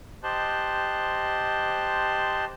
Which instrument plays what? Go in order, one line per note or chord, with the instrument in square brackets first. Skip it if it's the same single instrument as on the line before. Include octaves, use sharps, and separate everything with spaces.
[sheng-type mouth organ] G4 C5 D#5 A5 C6 F#6